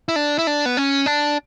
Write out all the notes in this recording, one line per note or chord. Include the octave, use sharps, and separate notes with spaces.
E4
D4
E4
D4
B3
C#4
D4